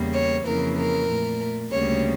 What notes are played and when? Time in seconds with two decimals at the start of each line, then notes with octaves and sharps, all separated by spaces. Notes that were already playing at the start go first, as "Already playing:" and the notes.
Already playing: E2 C#3 G3 A#3
0.14 C#5
0.46 F2 C#3 E3 A#3 A#4
0.78 A#4
1.09 A#2 A3
1.72 D2 C#3 G3 A#3 C#5